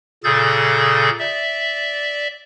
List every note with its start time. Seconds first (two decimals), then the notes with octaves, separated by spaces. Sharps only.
0.24 A#2 C#3 G#4 A4 G6 A6
1.19 D5 E5